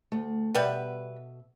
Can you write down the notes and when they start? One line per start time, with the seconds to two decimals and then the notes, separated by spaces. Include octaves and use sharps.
0.12 D2 A3
0.55 B2 G3 B3 B4 E5